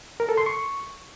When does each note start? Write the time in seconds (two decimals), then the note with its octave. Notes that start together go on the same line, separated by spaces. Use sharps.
0.20 A#4
0.29 A4
0.37 C6
0.46 C#6